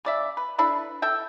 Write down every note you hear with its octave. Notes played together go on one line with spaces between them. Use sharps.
C#3 D5 E5
B4
D4 E4 A4 B4
A4 E5 G5